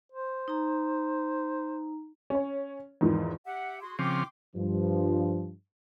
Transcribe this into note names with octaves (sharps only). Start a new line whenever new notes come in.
C5
D#4 A#5
C#4 C#5
E2 G#2 D#3 F3
G4 E5 F#5
F#4 G#4 C6
C#3 F3 C4 G5 C6 D6
G2 F3